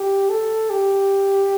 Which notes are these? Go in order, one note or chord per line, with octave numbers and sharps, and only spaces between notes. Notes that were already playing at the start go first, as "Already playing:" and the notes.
Already playing: G4
A4
G4